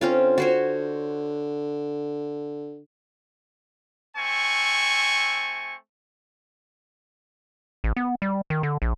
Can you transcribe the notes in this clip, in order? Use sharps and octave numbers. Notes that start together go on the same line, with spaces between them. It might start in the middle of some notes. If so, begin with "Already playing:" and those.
D3 C4 C#4 F4
F#4 C5 C#5
A3 C4 G#5 C#6
A1
B3
G3
D#3
D3
A#1